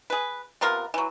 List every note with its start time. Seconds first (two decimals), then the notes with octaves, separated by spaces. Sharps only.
0.10 G#4 B4
0.61 C3 B3 F4 A#4
0.94 E3 F#3